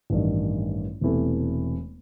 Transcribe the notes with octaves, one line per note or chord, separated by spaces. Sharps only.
A1 G2 D#3
E1 E2 C3 E3 A3